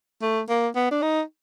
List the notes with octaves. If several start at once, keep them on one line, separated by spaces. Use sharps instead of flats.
A3
A#3
B3
D4
D#4